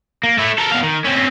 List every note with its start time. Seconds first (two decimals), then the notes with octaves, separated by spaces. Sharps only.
0.23 A#3
0.38 A3 E4
0.58 A4 A#4
0.71 B2 F5
0.83 D#3
1.04 C4 C#4